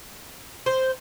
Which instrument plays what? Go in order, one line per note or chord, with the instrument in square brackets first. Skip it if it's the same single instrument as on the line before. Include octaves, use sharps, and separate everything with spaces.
[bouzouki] C5